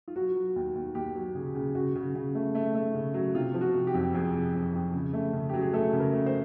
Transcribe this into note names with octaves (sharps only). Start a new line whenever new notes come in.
F4
F#3 F#4
F#3
D#2
D#2
D#2 G4
F#3
C#3 G#4
C#3
C#3 F#4
C#3
C#3
A3
A3
A3
C#3
F#3
C3 F4
F3
F#4
C3
G4
F2
F2 G#4
C3
F2
F2
C#3
A3
C#3
F#3 G4
G#4
A3 A4
C#3
A#4
A3
C5